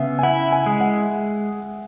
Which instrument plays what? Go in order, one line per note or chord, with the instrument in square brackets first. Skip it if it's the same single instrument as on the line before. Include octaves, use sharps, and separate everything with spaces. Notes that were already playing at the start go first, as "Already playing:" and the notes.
Already playing: [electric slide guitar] C#3 B3 [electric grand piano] E5
[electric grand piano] G#5
[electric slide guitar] E4 [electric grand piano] F#5
[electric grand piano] G#5
[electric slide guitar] G#3
[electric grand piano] F#5